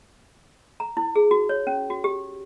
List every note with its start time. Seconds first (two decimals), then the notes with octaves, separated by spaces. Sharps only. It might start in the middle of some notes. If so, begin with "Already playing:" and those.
0.80 A#5
0.97 E4
1.16 G#4
1.31 F#4
1.49 C#5
1.67 C#4
1.90 F#4
2.04 G4